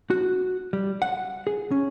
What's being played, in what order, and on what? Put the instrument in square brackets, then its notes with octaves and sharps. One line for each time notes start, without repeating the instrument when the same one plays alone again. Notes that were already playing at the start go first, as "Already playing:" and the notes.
[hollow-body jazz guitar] F#4
G3
F#5
G#4
C#4